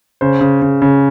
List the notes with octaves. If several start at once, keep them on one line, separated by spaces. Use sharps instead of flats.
C#3 C5
C#3
C#3
C#3